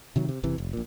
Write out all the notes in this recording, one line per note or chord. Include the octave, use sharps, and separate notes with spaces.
C3 D#3 F#3
C3
F#1 C3 E3
F1
A#1 A#2